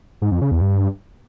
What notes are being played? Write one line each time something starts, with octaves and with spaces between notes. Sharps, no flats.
G#2
F2
C#3
E2
G2